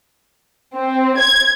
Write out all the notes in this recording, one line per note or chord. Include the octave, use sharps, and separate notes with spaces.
C4
G#6